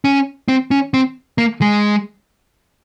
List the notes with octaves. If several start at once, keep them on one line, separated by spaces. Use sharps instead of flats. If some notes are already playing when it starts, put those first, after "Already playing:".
C#4
C4
C#4
C4
A#3
G#3